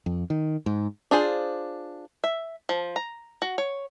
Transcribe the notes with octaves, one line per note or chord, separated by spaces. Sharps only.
F2
D#3
G#2
D4 F4 G#4 C5
E5
F3
A#5
F#4
C#5